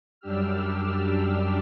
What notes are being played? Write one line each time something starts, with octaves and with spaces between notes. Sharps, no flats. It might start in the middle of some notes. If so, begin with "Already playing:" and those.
F#2 G3 D4 G4 E6 F6